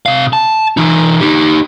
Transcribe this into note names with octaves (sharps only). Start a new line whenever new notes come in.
C3 F5
A5
E3 D#4
D#4 G4